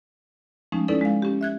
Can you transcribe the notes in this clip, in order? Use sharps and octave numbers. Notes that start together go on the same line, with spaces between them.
F3 G#3 A3 C#4 D#4
C#4 D#4 E4 A4 B4 D5
G#3 F5
C#4 G4
E5 F#6 G#6